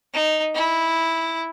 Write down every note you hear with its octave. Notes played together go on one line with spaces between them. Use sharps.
D#4
E4